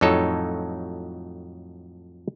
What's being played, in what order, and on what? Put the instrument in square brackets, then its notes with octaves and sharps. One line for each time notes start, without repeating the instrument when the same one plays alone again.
[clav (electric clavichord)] F2 A2 F#3 D#4 A4 C#5